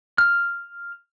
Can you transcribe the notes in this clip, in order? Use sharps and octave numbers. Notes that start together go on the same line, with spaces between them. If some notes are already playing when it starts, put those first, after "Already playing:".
F6